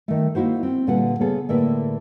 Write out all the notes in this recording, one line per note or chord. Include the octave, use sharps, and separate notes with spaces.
D#3 A3
A#3 D#4 E4 F#4 C5
C4
A#2 D3 G3 B4 F#5
C#3 B3 G#4 A4
A2 D3 A#3 B4 E5